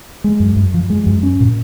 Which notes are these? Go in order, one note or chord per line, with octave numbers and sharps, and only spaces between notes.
G#3
F#2
F#2
F3
G#3
F#2
C#4
A#2